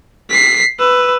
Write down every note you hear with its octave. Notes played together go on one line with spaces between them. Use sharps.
B6 C7
B4 E6